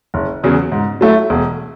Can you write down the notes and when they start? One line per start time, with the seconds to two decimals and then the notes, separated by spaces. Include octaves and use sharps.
0.14 F#1
0.44 E2 C#3 F#3
0.72 G#2
1.01 F#3 A3 E4
1.30 E1